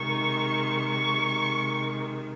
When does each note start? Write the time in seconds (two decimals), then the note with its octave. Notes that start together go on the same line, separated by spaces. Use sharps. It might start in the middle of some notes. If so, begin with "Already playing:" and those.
Already playing: C3 D#3 G#3 C#6
0.89 C#6